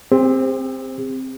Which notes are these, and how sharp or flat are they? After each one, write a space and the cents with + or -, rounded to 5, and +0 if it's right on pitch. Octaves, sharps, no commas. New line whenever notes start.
C4 +0 G4 +45